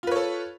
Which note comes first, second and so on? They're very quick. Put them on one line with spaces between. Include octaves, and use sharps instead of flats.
F4 B4 C#5 A4